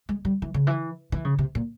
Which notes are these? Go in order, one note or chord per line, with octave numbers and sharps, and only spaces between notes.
G#3
G3
E3
C#3
E3
E3
C#3
C3
A#2